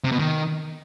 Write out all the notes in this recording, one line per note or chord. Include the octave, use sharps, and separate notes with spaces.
C3
B2
D#3